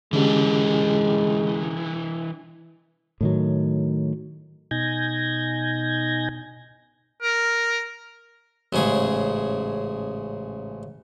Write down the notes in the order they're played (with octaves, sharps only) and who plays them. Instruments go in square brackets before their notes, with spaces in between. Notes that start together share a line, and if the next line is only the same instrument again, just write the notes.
[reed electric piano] D3 C#4 G4 [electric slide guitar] E3 D4 [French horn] G#3
[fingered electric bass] A2 D#3 F#3
[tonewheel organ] B2 D#4 G#5 G6 G#6 A#6
[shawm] A#4
[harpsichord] A1 G#2 C#3 G#4